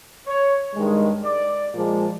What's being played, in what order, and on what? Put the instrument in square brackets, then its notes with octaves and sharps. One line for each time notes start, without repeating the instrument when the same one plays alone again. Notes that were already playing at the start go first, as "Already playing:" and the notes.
[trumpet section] C#5
[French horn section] G2 D#3 G#3
[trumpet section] D5
[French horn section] A#2 F3 G#3